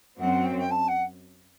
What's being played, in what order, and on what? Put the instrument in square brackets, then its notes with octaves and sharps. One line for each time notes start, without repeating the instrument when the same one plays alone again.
[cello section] F#2 F#3 C4 [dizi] F#5
[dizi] G5
G5
A5
F#5